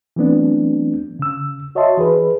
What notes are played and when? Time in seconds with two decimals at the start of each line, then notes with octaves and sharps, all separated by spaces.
0.16 E3 F#3 A3 B3 C4 D4
1.19 C#3 E6
1.75 F#4 C#5 D#5 E5 A5 C6
1.97 E3 G#4 B4